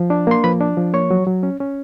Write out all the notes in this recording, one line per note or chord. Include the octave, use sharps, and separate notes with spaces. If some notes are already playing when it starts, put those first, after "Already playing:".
Already playing: F3
D4
A#3 C6
F3 B4 B5
D4
F3
A#3 C#5 C#6
F#3
F#3
C#4
C#4